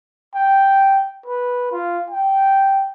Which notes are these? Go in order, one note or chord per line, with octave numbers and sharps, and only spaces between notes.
G5
B4
F4
G5